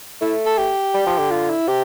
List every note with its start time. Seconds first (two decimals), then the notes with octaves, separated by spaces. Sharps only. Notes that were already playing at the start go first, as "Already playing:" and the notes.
0.21 A3 E4
0.46 A4
0.58 G4
0.94 G3
1.07 F3
1.19 D3
1.31 F4
1.50 E4
1.67 C3 G4